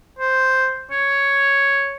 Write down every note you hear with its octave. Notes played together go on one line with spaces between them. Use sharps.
C5
C#5